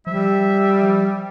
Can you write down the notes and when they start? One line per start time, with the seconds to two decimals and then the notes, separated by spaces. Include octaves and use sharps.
0.07 F3 G3 E5